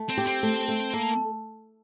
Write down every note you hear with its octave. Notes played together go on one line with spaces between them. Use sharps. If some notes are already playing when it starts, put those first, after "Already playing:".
Already playing: A3
C4
G4
C4
A3
A3
A#3 A4